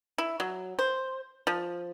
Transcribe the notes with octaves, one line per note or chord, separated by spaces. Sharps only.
E4
F#3
C5
F3